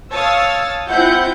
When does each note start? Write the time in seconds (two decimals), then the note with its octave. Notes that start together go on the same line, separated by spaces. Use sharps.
0.12 C#5 F5 A5 D#6 E6 A6
0.88 C4 E4 F4 F#5 G6